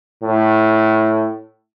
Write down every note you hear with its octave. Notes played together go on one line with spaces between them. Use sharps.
A2